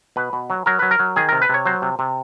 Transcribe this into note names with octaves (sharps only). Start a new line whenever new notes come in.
B2 B4
B2
F#3
F#3 A#4
F#3 B4
A#4
F#3
D#3 G#4
C3 A#4
B4
C3 C#5
F#3 C5
C3
C3